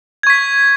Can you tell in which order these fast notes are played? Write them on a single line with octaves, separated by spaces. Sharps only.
G#6 C#6 B6